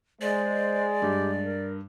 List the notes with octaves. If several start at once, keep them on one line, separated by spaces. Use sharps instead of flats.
G#3 C5 D5
G2 G4
A#4